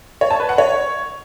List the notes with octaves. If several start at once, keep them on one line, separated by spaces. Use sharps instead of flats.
C#5
A5
B4
F#5
C#5